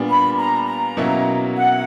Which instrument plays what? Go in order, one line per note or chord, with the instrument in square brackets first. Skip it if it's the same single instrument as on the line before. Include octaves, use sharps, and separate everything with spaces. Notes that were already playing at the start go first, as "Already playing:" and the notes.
Already playing: [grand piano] A#2 G3 B3 D4
[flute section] B5
A#5
A#5
[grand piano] B2 F#3 A#3 C#4 E4
[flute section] F#5